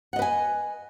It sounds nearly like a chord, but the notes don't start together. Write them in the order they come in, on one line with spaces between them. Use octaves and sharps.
F#5 D#5 B4 G#5